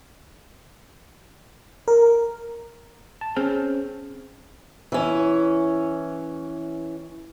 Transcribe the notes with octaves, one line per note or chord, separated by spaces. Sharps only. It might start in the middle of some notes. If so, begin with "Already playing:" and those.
A#4
A5
C4 C#4 G#4
E3 C#4